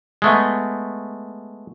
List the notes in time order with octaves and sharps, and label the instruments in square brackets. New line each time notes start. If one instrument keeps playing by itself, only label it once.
[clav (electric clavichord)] G#3 A3 B3